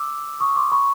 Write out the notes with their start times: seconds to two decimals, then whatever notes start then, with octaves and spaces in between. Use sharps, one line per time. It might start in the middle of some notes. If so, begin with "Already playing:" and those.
Already playing: D6 E6
0.40 C#6 D#6
0.56 C6 D6
0.72 B5 C#6